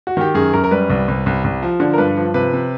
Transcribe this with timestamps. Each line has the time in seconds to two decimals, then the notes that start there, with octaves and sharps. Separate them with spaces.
0.07 F#4
0.17 D#3 G4
0.34 F#2 G#4
0.53 F#2 A#4
0.64 A#4
0.71 G3 B4
0.90 C2
1.08 C2
1.26 C2
1.44 C2
1.62 F3
1.80 D3
1.93 A#4
1.98 G2 B4
2.16 F3
2.34 C3 B4
2.53 C3